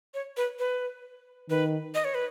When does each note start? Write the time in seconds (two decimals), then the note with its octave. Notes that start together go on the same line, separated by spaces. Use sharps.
0.14 C#5
0.37 B4
0.59 B4
1.50 D#3 B4
1.95 D#5
2.04 C#5
2.15 B4